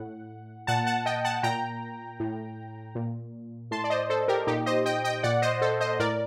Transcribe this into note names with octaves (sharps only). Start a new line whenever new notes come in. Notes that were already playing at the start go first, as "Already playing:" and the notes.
Already playing: A2 F#5
A#2 F#5 A5
F#5 A5
D#5 G5
F#5 A5
A#2 G5 A#5
A2
A#2
A2 A5 C6
D5
C5 D#5
A4 C5
G4 A#4
A#2 D#4 G4
C5 D#5
D#5 G5
D#5 G5
A#2 D5 F#5
C5 D#5
A4 C5
C5 D#5
A2 A#4 D5